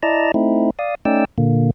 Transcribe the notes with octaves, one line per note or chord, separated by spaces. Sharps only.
E4 D5 D#5 A5 A#5
A3 C4 D#4 E4
D5 F5 D#6
A3 C#4 D#4 D5 G5 E6
A#2 D3 A#3